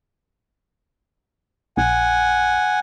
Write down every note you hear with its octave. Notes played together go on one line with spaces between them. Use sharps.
A#1 F#5 G#5